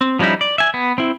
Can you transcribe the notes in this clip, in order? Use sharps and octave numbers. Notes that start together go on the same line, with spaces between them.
C4
F3 G3 C#4 D#4 E4
D5
E5 G#5
B3
C4 E4